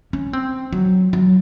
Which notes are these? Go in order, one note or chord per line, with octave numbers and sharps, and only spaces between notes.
C#4
C4
F#3
F#3